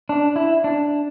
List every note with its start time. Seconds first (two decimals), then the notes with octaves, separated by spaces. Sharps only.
0.09 D4
0.36 E4
0.64 D4